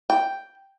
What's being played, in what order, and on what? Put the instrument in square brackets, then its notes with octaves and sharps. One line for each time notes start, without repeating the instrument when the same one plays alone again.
[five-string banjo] G5